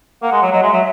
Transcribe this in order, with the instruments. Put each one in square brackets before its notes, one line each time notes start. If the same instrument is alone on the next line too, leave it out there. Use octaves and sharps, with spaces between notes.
[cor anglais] A#3 [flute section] F#5
[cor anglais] G#3
F#3
[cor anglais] F#3 [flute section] D#5
[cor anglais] G#3 [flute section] E5
[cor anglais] F#3